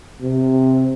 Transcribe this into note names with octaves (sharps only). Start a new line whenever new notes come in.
C3